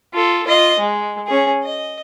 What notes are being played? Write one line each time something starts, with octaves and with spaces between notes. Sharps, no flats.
F4 A4
F4 D#5
G#3
C#4 G#4
D#5